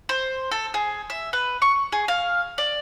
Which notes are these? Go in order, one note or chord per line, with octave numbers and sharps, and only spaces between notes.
C5
A4
G#4
E5
B4
C#6
G#4
F5
D5